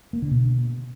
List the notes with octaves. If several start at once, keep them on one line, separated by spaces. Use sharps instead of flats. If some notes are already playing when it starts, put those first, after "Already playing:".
A#3
D3
B2